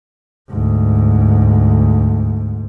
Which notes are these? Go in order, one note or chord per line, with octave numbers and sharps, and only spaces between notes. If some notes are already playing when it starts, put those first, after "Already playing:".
D2 G#2